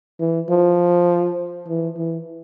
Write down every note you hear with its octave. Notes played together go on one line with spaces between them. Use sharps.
E3
F3
E3
E3